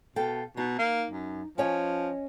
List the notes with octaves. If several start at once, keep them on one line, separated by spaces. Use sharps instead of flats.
B2 A4 F5 G5
B2 D#4
A#3
F#2
F3 C#4 C#5 D#5